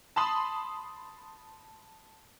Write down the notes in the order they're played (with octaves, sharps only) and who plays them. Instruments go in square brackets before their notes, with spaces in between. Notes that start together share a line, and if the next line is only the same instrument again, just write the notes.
[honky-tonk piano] A5 B5 C6 D#6